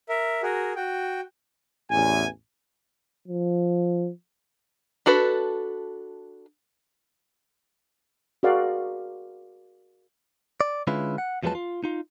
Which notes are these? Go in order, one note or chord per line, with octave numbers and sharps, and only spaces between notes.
A#4 E5
F#4 G#4 A#4
F#4 G5
A1 E2 G#5
F3
D4 F#4 A4 B4
F#4 G#4 A#4 D5 F5 F#5
D5
D3 G#3 C#4 E4 F4 B4
F#5
E2 F3 F#3 G#3 B4 A5
F4
D#4 F4